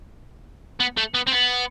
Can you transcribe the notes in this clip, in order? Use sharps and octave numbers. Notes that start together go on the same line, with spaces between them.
B3
A3
B3
C4
B3